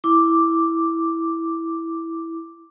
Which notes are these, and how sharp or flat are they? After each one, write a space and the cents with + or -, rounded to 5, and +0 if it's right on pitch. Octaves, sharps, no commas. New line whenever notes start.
E4 +0 D6 +0